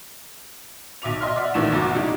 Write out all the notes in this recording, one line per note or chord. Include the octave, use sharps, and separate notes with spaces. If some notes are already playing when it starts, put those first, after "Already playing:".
B1 E5 D6 F7
D#5 E5 C6 F6
D5 E5 F#5
A#1 D#3 E3 A3 E6 E7
F#1 C2 B2 F#3 D6
G3 D#4 E4 G4